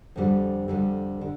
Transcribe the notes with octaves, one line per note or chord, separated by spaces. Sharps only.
F2 D3 G3
F2 D3 G3
D3